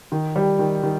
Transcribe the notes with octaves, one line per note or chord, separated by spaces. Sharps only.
D#3
G3
D#3
D#3